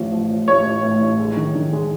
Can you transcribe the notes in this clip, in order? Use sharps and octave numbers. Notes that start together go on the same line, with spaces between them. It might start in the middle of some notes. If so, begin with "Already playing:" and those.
Already playing: A1 F3
F3
A1
A1 C#5
A1
A2
A1
G#3
D#3
D#3
G#3